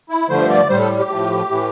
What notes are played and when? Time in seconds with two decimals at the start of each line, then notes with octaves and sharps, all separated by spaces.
0.09 E4
0.29 G2 D3 F3 A3 C5
0.50 D5
0.69 A2 G3 C5
0.80 A4
0.99 G4
1.10 A2 F3 A3
1.50 A2 E3 A3